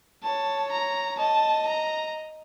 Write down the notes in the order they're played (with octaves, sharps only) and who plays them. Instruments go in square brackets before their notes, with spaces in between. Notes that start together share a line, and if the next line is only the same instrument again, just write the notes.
[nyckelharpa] C#5 [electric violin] A5
[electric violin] A#5
[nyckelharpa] D#5 [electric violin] A5
[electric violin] A#5